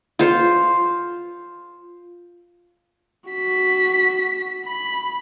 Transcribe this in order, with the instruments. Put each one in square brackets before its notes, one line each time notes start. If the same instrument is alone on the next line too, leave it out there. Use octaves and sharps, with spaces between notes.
[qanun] F4 C5
[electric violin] F#4 B6
B5